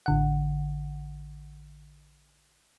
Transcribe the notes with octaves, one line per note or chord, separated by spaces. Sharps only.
A1 D3 F#5